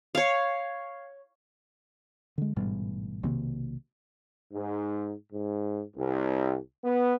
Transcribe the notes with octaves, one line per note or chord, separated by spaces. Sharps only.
C#5 F5
D3 G#3
A1 G#2 B2 G3
B1 C3 D#3 A#3
G#2
G#2
C2
B3